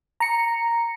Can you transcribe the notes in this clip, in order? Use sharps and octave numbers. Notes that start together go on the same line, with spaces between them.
A#5 C#7